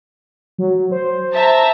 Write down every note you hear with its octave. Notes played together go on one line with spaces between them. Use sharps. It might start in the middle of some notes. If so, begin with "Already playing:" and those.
F#3
C5
E5 A5 A#5